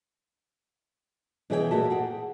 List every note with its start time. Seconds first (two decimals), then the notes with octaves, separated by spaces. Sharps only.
1.50 B2 E3 G#4 C#5 D5 G5
1.71 A#2 A3 F#4 A#4 E5 A5
1.90 G#4 F#5 G5